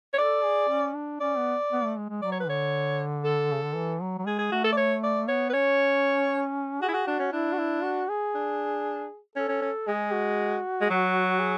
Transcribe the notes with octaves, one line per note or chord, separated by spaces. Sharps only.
C#5
A4 D5
G#4
C#4
D4
C#4 D5
B3
B3
A3
G#3
G#3
F#3 D5
C#5
B4
D3 C#5
A4
C#3
D3
E3
F#3
F#3
G#3 G#4
G#4
A3 F#4
A4
D5
C#5
D5
B3 C#5
B4
C#4 C#5
F#4 G#4
E4
F#4
D4 F#4
C#4
D4 E4
F#4
E4
F#4
G#4
D4
C#4 A4
C#4
C#4
G#3 G#4
F#4
G#3
F#3
G#4